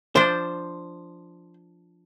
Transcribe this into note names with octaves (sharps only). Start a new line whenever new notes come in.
F3 D4 C5